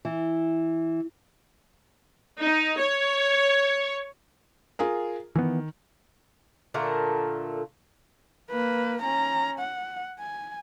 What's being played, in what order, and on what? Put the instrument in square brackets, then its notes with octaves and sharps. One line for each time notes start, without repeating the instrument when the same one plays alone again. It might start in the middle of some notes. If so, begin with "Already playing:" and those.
[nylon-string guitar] E3
[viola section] D#4
C#5
[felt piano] F4 G#4 A#4
[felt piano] D#3 [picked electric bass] E3 B3
[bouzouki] A#2 D3 A3 A#4
[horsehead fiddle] A#3 B4
C#4 A#5
F#5
G#5